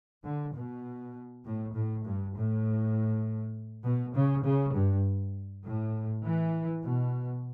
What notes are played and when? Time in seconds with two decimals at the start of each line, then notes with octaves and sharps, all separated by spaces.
0.24 D3
0.54 B2
1.44 A2
1.74 A2
2.05 G2
2.35 A2
3.84 B2
4.14 C#3
4.44 C#3
4.74 G2
5.64 A2
6.24 E3
6.84 B2